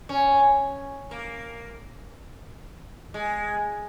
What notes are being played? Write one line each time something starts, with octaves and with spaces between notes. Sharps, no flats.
C#4
A#3
G#3